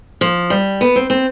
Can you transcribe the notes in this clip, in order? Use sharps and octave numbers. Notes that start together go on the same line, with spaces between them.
F3
G3
B3
C4
C4